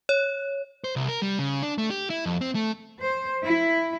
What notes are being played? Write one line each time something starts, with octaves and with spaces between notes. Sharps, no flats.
C#5
C5
C2
A#4
G3
C#3
D4
A3
G4
E4
F2
C4
A3
C5
E4